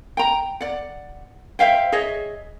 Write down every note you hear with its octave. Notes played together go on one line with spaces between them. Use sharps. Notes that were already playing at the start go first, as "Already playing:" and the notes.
G5 A#5
D5 F#5
C5 E5 F5 G5
G#4 C#5 D#5 E5